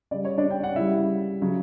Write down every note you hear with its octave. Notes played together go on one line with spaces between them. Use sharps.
C#3 G3 D5
C#5
D4 D5
G5
F#5
C#3 G3 E4 E5
C#3 F#3